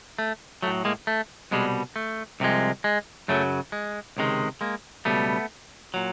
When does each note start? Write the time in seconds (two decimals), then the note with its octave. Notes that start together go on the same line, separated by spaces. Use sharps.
0.19 A3
0.62 F#3 A3
0.67 A2
0.85 G#3 A#3
1.07 A3
1.51 C2 B2 G3 G#3
1.96 A3
2.40 C2 C3 F3 G#3
2.84 G#3
3.28 F#2 C#3 F#3 A3
3.72 G#3
4.17 C#2 C3 D#3 G#3
4.61 G#3 A#3
5.05 C#2 B2 G3 A3 B3
5.94 A#2 F#3